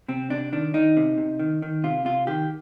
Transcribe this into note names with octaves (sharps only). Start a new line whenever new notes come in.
C3 C4
C3 D4
D#3 D4
D#3 D#4
C3
C3
D#3
D#3
C3 F4
C3 F4
D#3 G4